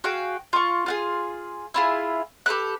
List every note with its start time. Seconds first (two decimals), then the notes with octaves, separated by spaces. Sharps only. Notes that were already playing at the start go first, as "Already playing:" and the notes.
0.04 F#4 G#4 F5 G5
0.53 F4 C#6
0.86 F4 F#4 G#4
1.74 E4 F4 G#4
2.46 G4 A4 B4 F#6